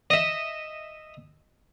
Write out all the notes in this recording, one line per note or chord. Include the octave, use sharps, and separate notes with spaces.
D#5 E5